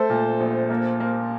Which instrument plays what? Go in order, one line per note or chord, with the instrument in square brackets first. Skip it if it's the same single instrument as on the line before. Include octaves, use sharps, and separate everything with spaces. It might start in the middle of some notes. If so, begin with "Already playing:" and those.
Already playing: [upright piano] A3 A4 C5
A#2
A#1
A#3
A#3